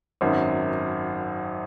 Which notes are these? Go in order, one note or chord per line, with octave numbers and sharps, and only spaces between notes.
G#1 F#2 D#3